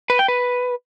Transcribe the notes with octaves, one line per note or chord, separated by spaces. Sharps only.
B4
G5
B4